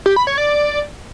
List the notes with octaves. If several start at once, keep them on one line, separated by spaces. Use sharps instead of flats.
G4
B5
C#5
D5